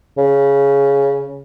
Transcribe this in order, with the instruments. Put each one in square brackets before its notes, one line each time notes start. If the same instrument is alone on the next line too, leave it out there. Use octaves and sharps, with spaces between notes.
[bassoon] C#3